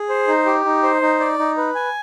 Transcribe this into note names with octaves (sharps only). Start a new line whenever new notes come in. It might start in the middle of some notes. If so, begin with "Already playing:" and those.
Already playing: G#4
C5
D#4
G4
D#4
C5
D#4
D5
D#4
B4
G#5